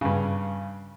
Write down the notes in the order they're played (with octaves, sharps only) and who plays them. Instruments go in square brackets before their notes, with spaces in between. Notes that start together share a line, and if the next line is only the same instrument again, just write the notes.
[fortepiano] G2 C#3